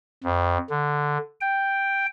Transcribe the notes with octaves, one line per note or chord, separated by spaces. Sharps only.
F2
D3
G5